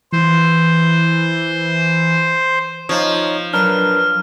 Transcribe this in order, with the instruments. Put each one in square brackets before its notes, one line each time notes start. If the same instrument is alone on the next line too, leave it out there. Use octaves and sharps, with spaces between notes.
[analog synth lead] E3 [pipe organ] C5
[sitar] F3 [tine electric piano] D#4 C#5
[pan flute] F#3 [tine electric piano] D4 A#4 B4 [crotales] F6